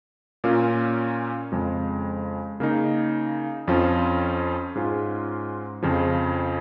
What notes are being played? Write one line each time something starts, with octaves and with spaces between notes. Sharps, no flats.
A#2 A#3 C#4 F4
F2 C#3 G#3
C#3 A#3 D#4
F2 F3 C#4 F4
G#2 G#3 C#4 F4
F2 C#3 F3